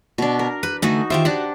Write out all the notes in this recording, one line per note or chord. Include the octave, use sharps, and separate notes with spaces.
B2 D4
A#4
B4
D3 A3 D#4 F#4 G#5
D#3 F4 G4 C5 E5
D4 F#4 G4 F#5